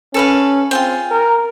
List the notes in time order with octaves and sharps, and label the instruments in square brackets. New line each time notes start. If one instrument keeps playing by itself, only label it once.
[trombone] C#4 [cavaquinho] A4 B4 F5
[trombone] C4 [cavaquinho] F4 G#4 G5
[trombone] A#4